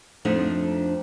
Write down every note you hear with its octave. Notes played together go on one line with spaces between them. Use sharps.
F2 F3 A3 D4 D#4 F5